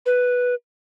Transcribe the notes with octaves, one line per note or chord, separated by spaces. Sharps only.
B4